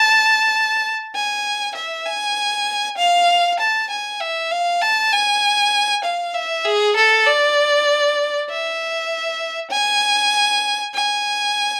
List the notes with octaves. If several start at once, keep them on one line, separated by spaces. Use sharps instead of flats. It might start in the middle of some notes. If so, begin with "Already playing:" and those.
Already playing: A5
G#5
E5
G#5
F5
A5
G#5
E5
F5
A5
G#5
F5
E5
G#4
A4
D5
E5
G#5
G#5